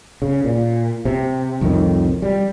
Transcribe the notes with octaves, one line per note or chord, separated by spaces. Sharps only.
C#3
A#2
C3
C2 F2 A2 D#3
G3